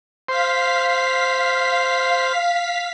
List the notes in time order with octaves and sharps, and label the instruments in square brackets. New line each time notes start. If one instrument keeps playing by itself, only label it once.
[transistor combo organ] C5 [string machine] F5 B6